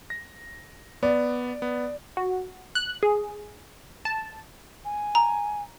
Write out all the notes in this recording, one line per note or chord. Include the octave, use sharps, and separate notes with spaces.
A#6
B3 D5
B3
F#4
F#6
G#4
A5
G#5
A#5